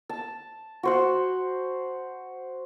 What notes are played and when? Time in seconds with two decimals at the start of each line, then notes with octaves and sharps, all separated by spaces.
0.09 A5
0.83 F#4 C5 F#5